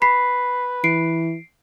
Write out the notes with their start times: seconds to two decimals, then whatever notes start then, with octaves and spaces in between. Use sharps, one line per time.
0.02 B4 B5 B6 C7
0.84 E3 C7 D7